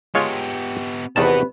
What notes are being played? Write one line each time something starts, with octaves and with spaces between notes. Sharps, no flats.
G#3 B3 F4 G4 C#5
E2 C3 D#3 B3 F#4 B4 A5